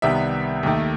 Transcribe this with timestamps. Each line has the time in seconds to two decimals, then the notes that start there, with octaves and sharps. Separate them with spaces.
0.02 C2 C3 D#3 G3 B3 E5
0.63 D#2 D#3 A3